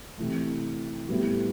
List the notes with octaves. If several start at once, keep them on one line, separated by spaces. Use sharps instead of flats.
C3 E3 A3
A2 G3 B3 E4 G4